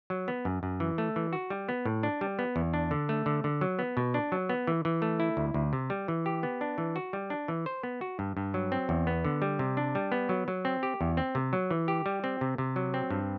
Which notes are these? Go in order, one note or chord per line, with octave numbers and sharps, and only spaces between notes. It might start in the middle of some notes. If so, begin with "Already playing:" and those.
F#3
B3
F#2
F#2
E3
A3
E3
F#4
G3
B3
A2
D4
G3
B3
E2
D4
D3
A3
D3
D3
F#3
B3
B2
D4
F#3
B3
E3
E3
A3
E4
D2
D2
C3
G3
E3
G4
B3
D4
E3
F#4
G3
D4
E3
C5
B3
F#4
G2
G2
F#3
C4
E2
B3
D3
G3
C3
D4
G3
B3
F#3
F#3
C4
G4
E2
C4
C3
F#3
E3
G4
G3
C4
C3
C3
F#3
C4
G2